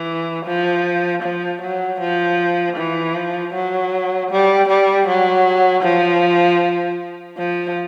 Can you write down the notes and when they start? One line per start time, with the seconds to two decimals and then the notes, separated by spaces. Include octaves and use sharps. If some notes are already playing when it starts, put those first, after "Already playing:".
Already playing: E3
0.46 F3
1.23 F3
1.62 F#3
2.00 F3
2.77 E3
3.15 F3
3.54 F#3
4.31 G3
4.69 G3
5.07 F#3
5.84 F3
7.38 F3